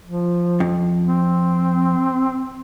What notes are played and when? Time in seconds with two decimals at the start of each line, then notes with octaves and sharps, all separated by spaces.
0.05 F3
0.60 F2
1.06 C4